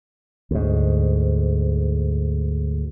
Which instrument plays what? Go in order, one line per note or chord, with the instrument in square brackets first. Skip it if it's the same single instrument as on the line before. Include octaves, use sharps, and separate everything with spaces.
[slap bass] D2 G#2